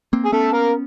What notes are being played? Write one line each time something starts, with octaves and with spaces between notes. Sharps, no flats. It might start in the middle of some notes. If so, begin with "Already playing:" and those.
A#3 C4
G#4
A3 B3 C#4 A4
A#3 A#4